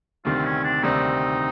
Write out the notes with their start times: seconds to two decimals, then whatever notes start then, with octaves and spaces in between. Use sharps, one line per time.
0.25 D2 C3 D#3 G3 C4 F4
0.45 C#4
0.64 D4
0.83 D2 C3 D#3 G3 C4 D#4